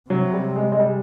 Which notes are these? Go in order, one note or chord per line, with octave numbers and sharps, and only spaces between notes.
C3 F#3
G3
G#3
G#3
G3